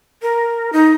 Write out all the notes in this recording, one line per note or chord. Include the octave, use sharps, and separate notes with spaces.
A#4
D#4